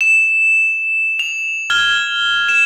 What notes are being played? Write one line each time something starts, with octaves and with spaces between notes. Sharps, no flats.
E7
F7
F6 G#6 G7
E7